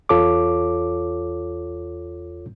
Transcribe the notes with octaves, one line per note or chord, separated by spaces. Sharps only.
E2 F4 A4 C#5 D6